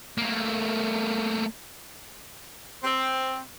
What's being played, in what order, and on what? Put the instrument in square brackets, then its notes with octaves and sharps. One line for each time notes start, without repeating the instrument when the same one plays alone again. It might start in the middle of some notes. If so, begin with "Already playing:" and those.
[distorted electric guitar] A3 A#3
[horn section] C4